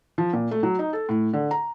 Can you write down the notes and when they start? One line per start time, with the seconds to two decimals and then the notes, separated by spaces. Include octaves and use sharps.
0.18 F3
0.33 A#2
0.51 A3
0.63 F#3
0.79 D#4
0.93 A4
1.09 A2
1.33 D3
1.51 A#5